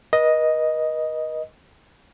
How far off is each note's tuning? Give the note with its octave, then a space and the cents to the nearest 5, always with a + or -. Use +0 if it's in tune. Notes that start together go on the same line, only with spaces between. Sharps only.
B4 -45 D#5 +0